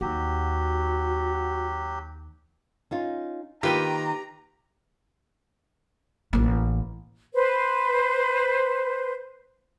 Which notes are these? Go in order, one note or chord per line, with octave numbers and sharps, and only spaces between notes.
D#2 F#3 F#4 G4
C#4 D#4 F4
D#3 A#3 F4 G4 B4 G5 A#5
A1 A#3
B4 C5